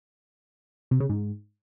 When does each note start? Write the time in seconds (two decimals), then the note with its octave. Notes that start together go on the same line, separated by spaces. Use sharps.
0.91 C3
1.00 C#3
1.09 G#2